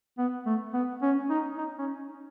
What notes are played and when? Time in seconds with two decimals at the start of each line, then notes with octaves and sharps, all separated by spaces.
0.18 B3
0.46 A3
0.74 B3
1.02 C#4
1.30 D#4
1.58 D#4
1.79 C#4